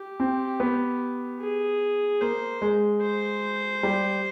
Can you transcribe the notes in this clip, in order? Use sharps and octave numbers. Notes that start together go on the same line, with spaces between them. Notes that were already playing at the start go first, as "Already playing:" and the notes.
Already playing: G4
C4
B3
G#4
A#3 C5
G#3
C5
G3